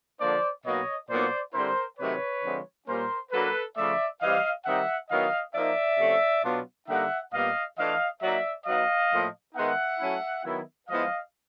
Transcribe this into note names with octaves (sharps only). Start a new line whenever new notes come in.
D3 F3 A#3 D4 C5 D5
B2 F#3 A#3 D#4 C#5 D#5
A#2 F#3 B3 D#4 C5 D5
D3 G3 C4 E4 A#4 C5
C3 D#3 F#3 A3 B4 C#5
D3 F3 G#3 C4
A#2 G3 A#3 C#4 A#4 C5
F#3 A#3 D4 A4 B4
C#3 F3 A3 D5 E5
E3 G3 C4 D#5 F5
D#3 G3 C4 D#4 E5 F#5
D#3 F#3 B3 E4 D#5 F5
F3 A#3 D#4 D5 E5
C3 F3 A3 C#4
B2 F#3 B3 D4 F4
D3 G3 A#3 D#4 E5 F#5
A#2 G3 B3 D#5 F5
E3 A3 D4 F4 D#5 F5
F#3 A#3 D#4 D5 E5
F#3 B3 D#4 D#5 F5
A2 F3 A#3
D#3 G#3 B3 D#4 E5 F#5
F#3 A3 C#4 E4
D#3 F#3 B3 E4
F3 G#3 B3 E4 D#5 F5